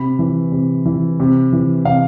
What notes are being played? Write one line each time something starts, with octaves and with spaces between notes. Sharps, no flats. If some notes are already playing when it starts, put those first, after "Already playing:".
Already playing: C3 B5
E3
C3
E3
C3
E3
C3 F5